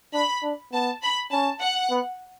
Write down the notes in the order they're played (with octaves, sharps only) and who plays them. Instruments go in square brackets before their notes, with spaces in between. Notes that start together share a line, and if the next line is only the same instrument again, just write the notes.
[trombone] D4 [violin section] B5
[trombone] D4
[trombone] B3 [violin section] A5
[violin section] B5
[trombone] C#4 [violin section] A5
[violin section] F#5
[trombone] B3